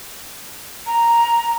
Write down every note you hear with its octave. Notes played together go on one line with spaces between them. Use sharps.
A#5